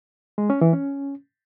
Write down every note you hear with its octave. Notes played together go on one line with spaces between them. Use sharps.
G#3
C#4
E3
C#4